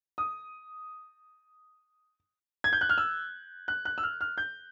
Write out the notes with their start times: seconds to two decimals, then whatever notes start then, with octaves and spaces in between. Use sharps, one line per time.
0.18 D#6
2.64 G#6
2.73 G6
2.81 F#6
2.89 F6
2.98 E6
3.68 F#6
3.85 F#6
3.98 E6
4.03 F6
4.21 F6
4.38 G6